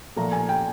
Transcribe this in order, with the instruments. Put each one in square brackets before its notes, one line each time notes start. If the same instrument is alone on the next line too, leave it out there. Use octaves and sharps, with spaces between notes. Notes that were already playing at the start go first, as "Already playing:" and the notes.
[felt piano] A#2 F3 A3 A#5
G#5
G5